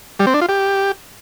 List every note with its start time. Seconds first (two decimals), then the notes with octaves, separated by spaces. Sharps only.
0.20 G3
0.27 C4
0.34 D4
0.41 F4
0.49 G4